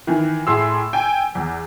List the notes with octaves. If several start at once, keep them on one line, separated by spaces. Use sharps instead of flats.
D#3 E3
A2 G#4 C6 E6
G5 G#5
E2